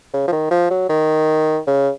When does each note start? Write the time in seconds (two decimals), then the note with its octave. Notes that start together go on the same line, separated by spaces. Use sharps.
0.13 C#3
0.28 F3
0.32 D#3
0.51 F3
0.70 F#3
0.89 D#3
1.67 C#3